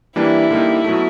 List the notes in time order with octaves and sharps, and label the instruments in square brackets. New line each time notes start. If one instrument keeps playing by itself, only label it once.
[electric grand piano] E3 G3 A#3 D4 [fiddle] E4
[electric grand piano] D3 G3 A#3 D#4
B2 F#3 A3